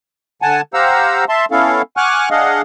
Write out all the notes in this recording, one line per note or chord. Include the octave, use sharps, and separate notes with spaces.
D3 F#5 G#5 A5
G4 C5 F5 F#5 A#5 E6
E5 A5 C6
B3 C#4 E4 A4 F5
F#5 G#5 C#6 D6 F6 F#6
D4 G#4 D#5 F5 F#5